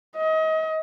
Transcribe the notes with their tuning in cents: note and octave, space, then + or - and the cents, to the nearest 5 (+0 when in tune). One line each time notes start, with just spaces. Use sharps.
D#5 +30